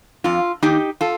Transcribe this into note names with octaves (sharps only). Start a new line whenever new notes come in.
F2 F4
D#3 A#3 D#4 G4
F4 A4